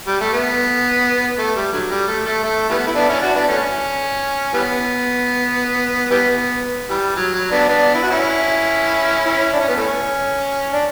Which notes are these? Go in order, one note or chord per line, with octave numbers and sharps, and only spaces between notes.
G3
A3
B3
A3
G3
D3 F#3
G3
A3
A3
A3
E3 G3 B3
E4
B3 D4
C#4 E4
D4 F#4
B3 D4
E3 A3 C#4
E3 G3 B3
E3 G3 B3
E3 G3
F#3
F#3
B3 D4
B3 D4
E4
F#4
C#4 E4
C#4 E4
D4
C#4
B3
E3 A3 C#4
D4